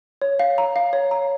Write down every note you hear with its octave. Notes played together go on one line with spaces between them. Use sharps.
C#5
F5
A#5
F5
C#5
A#5